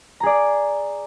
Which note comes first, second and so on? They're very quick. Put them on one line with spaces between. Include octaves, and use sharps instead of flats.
A#5 G#4 D5